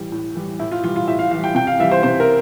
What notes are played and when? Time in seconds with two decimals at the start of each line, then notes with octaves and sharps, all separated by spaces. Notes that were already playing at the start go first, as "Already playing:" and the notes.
Already playing: A2 E3 G3
0.12 A2
0.35 E3 G3
0.59 A2 E4
0.71 F4
0.84 E3 G3 F4
0.96 F4
1.08 A2 E5
1.19 F5
1.31 E3 G3 F5
1.44 G5
1.55 C3 G5
1.67 F5
1.80 E3 G3 E5
1.91 C5
2.03 C3 C5
2.20 A#4